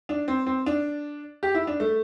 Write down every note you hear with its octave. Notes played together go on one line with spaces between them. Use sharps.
D4
C4
C4
D4
G4
E4
D4
A3